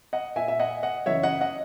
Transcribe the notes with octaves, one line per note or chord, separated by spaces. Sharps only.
D#5 F#5
A#2 E5 G#5
E5
D#5 F#5
D#5 F#5
F#2 C#3 E3 C#5 E5
D#5 F#5
D#5 F#5